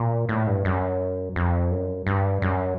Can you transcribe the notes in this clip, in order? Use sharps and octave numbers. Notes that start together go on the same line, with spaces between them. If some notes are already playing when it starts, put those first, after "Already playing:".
Already playing: A#2
A2
G2
F#2
F2
F#2
G2
F#2